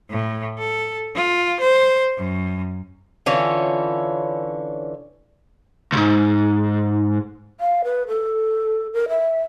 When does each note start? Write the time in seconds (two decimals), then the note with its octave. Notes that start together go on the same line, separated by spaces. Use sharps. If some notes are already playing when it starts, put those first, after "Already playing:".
0.11 A2
0.59 A4
1.15 F4
1.61 C5
2.17 F#2
3.26 D3 E3 C#4 F4
5.92 C#2 G#2
7.60 F5
7.84 B4
8.08 A4
8.93 A#4
9.09 E5